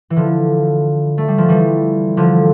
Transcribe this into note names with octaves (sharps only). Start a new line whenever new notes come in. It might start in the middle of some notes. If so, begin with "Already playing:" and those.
E3
D3 F3
A3
G3
F3
E3 G3
D3 F3